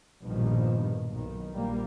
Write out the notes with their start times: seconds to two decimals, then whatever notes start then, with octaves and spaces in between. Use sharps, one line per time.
0.22 A#1 G2 B2 D#3 F3
1.11 B1 D#3
1.53 A#1 G3 A#3